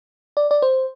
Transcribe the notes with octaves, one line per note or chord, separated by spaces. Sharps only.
D5
D5
C5